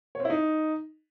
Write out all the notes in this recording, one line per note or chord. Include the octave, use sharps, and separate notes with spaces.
C#5
C4
E4
D#4